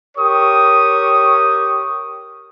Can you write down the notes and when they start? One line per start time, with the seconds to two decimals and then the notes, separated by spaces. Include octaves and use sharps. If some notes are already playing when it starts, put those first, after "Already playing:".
0.16 G4 A#4 C#5 C#6 D#6